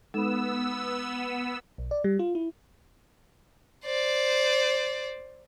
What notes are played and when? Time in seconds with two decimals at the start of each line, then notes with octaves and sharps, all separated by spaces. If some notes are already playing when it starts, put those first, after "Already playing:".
0.14 G#3 B3 D#4 A4 E6
1.78 B1
1.91 D5
2.04 G3
2.19 F4
2.35 E4
3.85 C5 D5